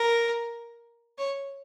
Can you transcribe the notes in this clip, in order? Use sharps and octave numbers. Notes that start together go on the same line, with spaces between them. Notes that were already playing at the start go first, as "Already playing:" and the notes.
Already playing: A#4
C#5